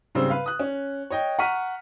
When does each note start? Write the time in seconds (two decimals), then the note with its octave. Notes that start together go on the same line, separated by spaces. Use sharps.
0.15 G#2 C#3 G3 C4 E6
0.30 B4 F5
0.46 D#6 F#6
0.59 C#4
1.10 C#5 D#5 G5
1.39 F#5 A#5 C#6 F6 B6 D#7